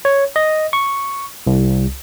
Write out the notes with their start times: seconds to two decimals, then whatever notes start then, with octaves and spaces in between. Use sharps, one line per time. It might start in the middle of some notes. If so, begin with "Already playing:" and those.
0.05 C#5
0.36 D#5
0.73 C#6
1.47 C2